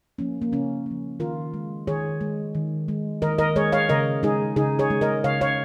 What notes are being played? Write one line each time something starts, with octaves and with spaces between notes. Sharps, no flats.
F3 A#3 C#4
A#3
C#3 C#4
F3 A#3
D#3 F4 A#4
G#3
D#3 G#4 C#5
G#3
D#3
G#3
D#3 A#4 D#5
A#4 D#5
G#3 G#4 C#5
C#5 F5
C#3 A#4 D#5
G#3 D#4 G#4
C#3 D#4 G#4
G#4 C#5
G#3
A#4 D#5
C#3 C#5 F5
C#5 F5